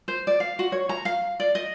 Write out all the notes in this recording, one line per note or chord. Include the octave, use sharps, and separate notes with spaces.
C5
D5
F5
F#4
C#5
A#5
F5
D5
D#5